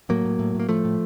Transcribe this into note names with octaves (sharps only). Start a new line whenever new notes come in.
A2 F#3 A#3
A2
A2
A2 A#3
A2 F3 A3
A2